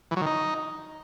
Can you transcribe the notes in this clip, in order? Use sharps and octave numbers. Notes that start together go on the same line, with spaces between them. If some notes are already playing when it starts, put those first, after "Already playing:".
E3
F#3
D#3
D#4